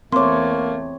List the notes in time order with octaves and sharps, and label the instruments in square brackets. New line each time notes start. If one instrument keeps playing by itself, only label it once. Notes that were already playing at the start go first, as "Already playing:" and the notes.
[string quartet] E2 A3 [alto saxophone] A#3 [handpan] C4 C#5 [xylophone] C6 D6